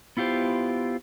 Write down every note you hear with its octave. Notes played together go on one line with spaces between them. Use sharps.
B3 E4 F4 G4 C5